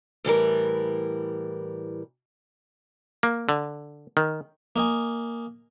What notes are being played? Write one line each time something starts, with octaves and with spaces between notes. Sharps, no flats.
A2 E3 G3 A#4
A#3
D3
D#3
A#3 D#5 G#5